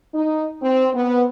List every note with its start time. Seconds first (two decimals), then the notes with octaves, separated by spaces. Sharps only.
0.13 D#4
0.62 C4
0.93 B3